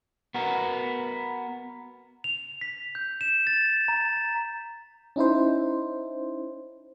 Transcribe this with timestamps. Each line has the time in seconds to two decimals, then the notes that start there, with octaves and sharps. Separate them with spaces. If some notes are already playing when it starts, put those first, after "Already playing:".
0.34 B3 F#4 A#4
2.24 F7
2.61 B6
2.95 G6
3.21 E7
3.47 A6
3.88 A#5
5.16 C#4 D#4 E4 C5